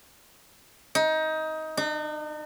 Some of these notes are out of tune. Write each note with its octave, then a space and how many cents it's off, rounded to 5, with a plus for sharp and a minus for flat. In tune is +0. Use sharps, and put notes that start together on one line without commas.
D#4 +20
D#4 -45